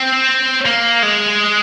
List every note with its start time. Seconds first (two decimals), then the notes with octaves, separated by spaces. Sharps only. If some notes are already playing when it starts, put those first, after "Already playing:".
Already playing: C4
0.66 A#3
1.03 G#3